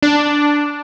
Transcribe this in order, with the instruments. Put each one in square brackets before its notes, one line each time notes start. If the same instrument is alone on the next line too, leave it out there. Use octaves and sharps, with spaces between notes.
[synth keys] D4